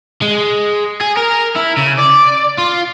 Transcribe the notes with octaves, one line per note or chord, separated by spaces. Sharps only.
G#3
G#4
A#4
E4
C#3
D5
F4